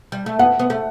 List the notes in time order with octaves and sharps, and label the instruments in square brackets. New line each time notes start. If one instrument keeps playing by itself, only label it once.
[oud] G3
A3
[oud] B3 [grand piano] F#5
[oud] B3
A3